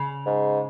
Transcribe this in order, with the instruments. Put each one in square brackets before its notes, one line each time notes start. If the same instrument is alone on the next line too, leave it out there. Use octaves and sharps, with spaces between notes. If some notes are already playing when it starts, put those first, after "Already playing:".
Already playing: [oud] C#3
[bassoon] G#2